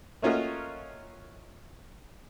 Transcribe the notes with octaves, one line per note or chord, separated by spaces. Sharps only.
A3 A#3 C#4 F4 F#4 D#5